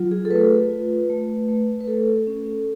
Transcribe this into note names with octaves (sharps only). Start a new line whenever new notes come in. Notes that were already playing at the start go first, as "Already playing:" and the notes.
Already playing: F#3 F4
G#4
A4
A3 B4
F4
A3
A3
B4
A3 A4
C#4